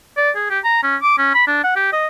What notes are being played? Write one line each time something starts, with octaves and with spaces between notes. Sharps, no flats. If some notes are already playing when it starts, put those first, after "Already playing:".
D5
G#4
G4
A#5
C#4
D6
C#4
B5
D4
F#5
G4
D#5